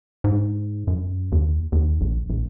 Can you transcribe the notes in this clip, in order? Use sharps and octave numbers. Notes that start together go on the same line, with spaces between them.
G#2
F#2
D#2
D#2
A#1
A#1